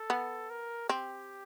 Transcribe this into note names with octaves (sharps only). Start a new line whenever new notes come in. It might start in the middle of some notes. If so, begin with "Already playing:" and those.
Already playing: A4
B3
A#4
C4 G4